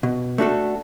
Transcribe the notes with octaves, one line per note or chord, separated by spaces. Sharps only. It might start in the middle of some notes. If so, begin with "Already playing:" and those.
B2
A3 D4 F#4 A4